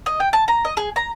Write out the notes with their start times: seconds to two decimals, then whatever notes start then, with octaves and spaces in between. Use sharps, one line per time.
0.06 D#5
0.20 G5
0.33 A5
0.48 A#5
0.65 D#5
0.77 G#4
0.96 A#5